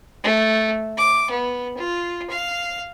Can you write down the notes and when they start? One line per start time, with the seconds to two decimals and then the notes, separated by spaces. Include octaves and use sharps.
0.23 A3
0.97 D6
1.30 B3
1.77 F4
2.30 F5